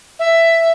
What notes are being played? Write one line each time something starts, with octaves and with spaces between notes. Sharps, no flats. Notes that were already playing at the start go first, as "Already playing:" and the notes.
E5